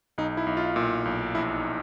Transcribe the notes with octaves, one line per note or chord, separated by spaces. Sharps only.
B1 D#4
E4
B1
F4
A#2
B1
A#1 E4
D#4